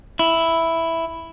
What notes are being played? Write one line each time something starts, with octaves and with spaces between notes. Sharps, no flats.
E4